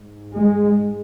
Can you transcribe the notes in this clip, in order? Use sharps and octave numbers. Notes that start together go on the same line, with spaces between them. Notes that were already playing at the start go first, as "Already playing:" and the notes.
Already playing: G#2
G#3